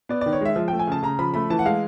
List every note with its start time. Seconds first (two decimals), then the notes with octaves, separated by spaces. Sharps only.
0.09 B3 D5
0.21 D#3 D5
0.33 C#5
0.41 G#3 E5
0.56 F3
0.68 A3 G5
0.79 G#5
0.87 C#3 A5
1.02 C#3 A#5
1.19 F3 B5
1.34 A3 B5
1.50 E3 A5
1.59 F#5
1.65 G#3 F5